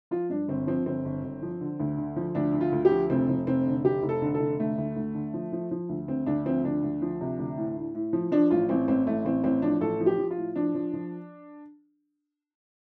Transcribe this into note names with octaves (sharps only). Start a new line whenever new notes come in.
F3 F4
G2 D4
G1 C4
F3 C4
G1 C4
G1
G1
F3
D3
D2
D3
F3
D2 D4
D3
F4
D2
G4
F3
F1 C4
F1
F1 C4
D3
F1 G4
F1
A4
D3
A4
F1
D3 A3
D2
D2
D3
F3
F3
F3
D2
D2 C4
D2 D4
F3 C4
D2 D4
D2
F3
C3
D2
A2
A2
A2
F3
F3 D4
A1 F4
A1 C4
A1 C4
A1 A3
A1 C4
A1 C4
F3 D4
A1 A4
F3
G4
F3
F4
A2
F3 D4
F3
F3